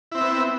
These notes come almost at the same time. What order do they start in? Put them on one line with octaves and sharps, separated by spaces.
E4 C4 E5 B3